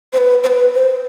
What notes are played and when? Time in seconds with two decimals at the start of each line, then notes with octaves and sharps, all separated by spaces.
0.13 C5
0.18 B4
0.43 C5
0.47 B4
0.75 C5